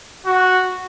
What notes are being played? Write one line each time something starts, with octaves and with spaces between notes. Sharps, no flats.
F#4